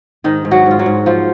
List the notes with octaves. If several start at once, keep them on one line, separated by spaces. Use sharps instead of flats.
G#2 D#3 D#4
G#2
F#3 F#4
G#2 F4
F#3 F#4
G#2
F3 F#3 F4